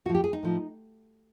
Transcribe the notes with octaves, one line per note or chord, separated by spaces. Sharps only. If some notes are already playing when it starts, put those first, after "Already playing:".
A2 F3 F#4
G4
G#4
D#4
A2 F3